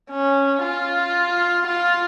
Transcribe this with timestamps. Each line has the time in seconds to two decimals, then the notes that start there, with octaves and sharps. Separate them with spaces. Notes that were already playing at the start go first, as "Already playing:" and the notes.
0.11 C#4
0.63 F4
1.67 F4